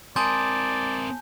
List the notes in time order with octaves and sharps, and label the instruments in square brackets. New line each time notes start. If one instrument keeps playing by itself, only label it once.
[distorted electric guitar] C4 A#4 [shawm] D5 [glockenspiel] G#5 A5 G6 [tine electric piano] C6 D#6